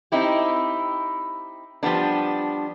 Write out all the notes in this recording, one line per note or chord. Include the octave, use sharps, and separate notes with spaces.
C4 D#4 E4 G4
F3 G3 B3 D4